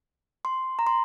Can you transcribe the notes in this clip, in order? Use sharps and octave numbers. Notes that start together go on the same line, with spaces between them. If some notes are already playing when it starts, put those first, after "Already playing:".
C6
A#5
C6